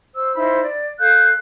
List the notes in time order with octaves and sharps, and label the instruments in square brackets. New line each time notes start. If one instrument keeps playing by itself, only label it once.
[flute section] C5 E6
D#4 E4 C5 B5
D5
A4 F5 F#6 G6